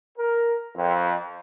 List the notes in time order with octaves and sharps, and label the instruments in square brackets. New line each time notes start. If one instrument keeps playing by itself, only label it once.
[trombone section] A#4
F2